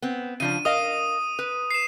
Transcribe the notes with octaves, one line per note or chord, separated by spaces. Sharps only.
B3 C4
C#3 F3 D4 D#7
A#4 D#5 F5 D#6
B4
C7 E7